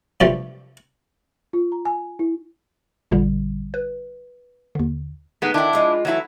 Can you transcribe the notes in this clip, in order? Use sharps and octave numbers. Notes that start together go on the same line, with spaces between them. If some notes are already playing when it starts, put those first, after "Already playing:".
G2 C3 F3 G3 A3 C4
F4
A#5
G#5
E4
A1 A#2 D3 G3
B4
D#2 D3
A2 G#3 B3 D#4
D#3 D4 E4 G5
F3 G#3 F4
E3 F#3 A3 E4 A#5